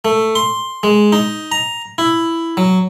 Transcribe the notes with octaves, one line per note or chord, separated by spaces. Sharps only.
A3
C6
G#3
D#4
A#5
E4
F#3